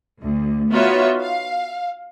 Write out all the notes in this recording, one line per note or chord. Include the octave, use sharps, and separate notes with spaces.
D2
B3 D#4 F4 F#4 C#5 E5
F5